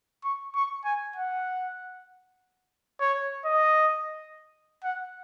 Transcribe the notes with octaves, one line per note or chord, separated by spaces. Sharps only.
C#6
C#6
G#5
F#5
C#5
D#5
F#5